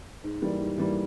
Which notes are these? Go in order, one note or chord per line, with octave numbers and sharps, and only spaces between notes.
G#2
E3 G3 A#3
G#2
E3 G3 A#3